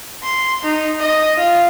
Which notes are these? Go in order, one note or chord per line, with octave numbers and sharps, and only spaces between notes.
C6
D#4
D#5
F4